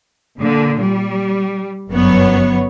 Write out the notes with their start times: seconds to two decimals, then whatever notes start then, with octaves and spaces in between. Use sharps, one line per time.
0.40 A#2 D3
0.82 G3
1.90 G1 F#2 F#3 B3 C#5